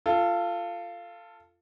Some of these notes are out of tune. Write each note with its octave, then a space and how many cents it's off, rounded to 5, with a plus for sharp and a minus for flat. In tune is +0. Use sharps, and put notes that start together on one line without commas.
F4 -10 A4 +15